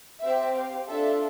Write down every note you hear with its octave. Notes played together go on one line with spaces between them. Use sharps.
C4 G4 E5
F5
D4 F4 A4 E5